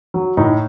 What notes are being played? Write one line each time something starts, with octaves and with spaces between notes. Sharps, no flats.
F#3
A2 D#4